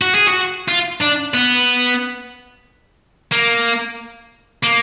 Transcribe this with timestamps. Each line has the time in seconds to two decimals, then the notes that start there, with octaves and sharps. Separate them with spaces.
0.02 F#4
0.15 G#4
0.28 F#4
0.68 F4
1.00 D4
1.34 B3
3.32 A#3
4.63 A#3